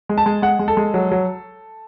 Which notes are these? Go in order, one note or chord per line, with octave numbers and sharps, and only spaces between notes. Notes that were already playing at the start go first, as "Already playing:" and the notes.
G#3
A5
G#3
G#3 F#5
G#3
A4
G#3
F#3
F#3